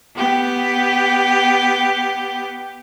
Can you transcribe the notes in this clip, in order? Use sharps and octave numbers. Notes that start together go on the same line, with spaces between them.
B3 G4